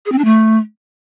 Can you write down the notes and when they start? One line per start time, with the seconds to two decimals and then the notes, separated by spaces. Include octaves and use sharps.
0.06 G#4
0.12 C4
0.18 D4
0.25 A3